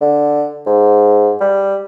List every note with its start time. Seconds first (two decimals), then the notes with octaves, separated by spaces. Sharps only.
0.01 D3
0.67 G#2
1.41 G3